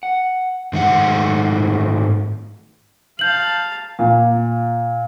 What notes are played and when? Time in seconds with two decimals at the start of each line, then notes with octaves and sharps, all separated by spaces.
0.03 F#5
0.73 G#2 D#3 G#3 A3 F#5
3.19 F5 A5 G6 F#7
3.99 A#2